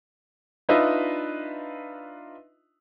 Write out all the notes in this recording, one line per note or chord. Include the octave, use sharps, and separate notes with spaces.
D4 D#4 F4 B4 D#5 E5